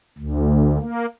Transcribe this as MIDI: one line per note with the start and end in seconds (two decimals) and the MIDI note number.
0.18 0.78 38
0.80 1.06 58